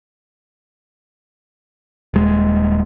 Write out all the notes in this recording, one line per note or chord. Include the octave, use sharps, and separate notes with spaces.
D#1 G#3